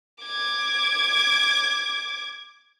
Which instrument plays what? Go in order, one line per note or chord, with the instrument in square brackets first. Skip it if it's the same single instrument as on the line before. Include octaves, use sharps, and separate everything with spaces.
[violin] D6 G#6